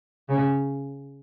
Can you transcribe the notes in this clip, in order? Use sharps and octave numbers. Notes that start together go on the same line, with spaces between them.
C#3